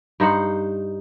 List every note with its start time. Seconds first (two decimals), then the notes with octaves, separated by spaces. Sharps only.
0.20 G2 D#4 C5 F#5